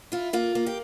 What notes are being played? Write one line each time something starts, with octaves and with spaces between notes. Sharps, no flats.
E4 F4
A#3 F4
A#3
G4